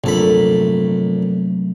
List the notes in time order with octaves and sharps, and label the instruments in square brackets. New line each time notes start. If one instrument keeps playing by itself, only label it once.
[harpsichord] A#1 A4 B5 [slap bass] C3 F#3 A3